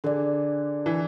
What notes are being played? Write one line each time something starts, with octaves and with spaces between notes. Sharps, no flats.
D3 D4 G#4 D5
E3